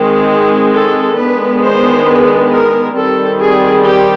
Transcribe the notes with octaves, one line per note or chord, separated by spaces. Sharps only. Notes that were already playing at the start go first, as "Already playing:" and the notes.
Already playing: D#3 G#3 C4
A4
D#3 G#3 B3 D4 B4
C5
B4
A#4
D#3 G3 C4 A4
G#4
G4